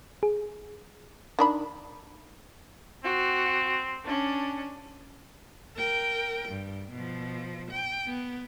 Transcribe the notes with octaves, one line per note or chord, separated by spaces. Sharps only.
G#4
D#3 D4 B5
C4 F#4
C#4 D4
A#4 G5
G2
B2 F3
G5
B3